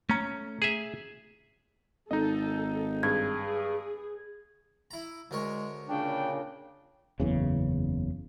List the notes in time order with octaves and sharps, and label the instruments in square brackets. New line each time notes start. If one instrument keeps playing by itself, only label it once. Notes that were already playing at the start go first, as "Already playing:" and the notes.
[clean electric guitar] A3 A#5 [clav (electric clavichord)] C#4
[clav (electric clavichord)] G#4 E5
[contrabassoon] G#1 [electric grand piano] D#4 D#5 [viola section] A4
[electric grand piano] G2 [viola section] G#4 [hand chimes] G#6
[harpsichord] E4 A#5
[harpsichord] D2 A#4 C#5 [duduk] G#3
[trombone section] A#2 C#3 [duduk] D4 [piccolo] G5
[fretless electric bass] F#1 E2 C#3